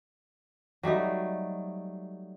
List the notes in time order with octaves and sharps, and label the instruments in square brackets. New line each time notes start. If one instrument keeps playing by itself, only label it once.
[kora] F#3 G3 A3 D#4